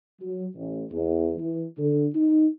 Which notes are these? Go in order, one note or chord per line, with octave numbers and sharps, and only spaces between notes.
F#3
A1
E2
E3
D3
D#4